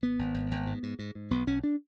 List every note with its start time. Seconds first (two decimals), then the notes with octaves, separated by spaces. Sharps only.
0.02 G#1 B3
0.19 G#1
0.34 G#1
0.51 G#1
0.67 G#2
0.83 G#2
0.99 G#2
1.15 G#2
1.31 B1 B3
1.47 B1 C#4
1.64 D4